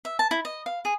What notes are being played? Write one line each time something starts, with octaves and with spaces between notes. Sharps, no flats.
E5
A5
E4
D#5
F5
G#4